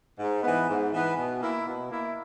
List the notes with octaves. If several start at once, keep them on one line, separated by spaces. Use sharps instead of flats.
G#2
E3 B3
G#2
E3 B3
B2
A#3 E4
B2
A#3 E4